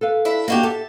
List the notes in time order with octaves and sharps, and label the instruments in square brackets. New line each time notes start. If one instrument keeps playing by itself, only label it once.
[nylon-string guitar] A4 B4 F5
[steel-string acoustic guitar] D4 E4 E5
[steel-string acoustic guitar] A#3 F#4 G4 [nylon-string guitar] D4 D#5
[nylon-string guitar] G4 A4 E5 [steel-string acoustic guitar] A5